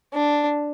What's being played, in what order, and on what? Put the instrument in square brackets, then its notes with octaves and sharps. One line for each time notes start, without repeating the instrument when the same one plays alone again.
[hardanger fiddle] D4